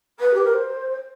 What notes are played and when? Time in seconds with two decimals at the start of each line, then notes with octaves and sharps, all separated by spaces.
0.19 B4
0.33 G4
0.44 A#4
0.53 C5